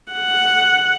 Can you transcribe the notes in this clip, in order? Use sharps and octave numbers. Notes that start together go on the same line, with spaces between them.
F#5